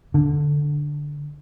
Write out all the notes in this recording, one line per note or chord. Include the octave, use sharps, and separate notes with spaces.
D3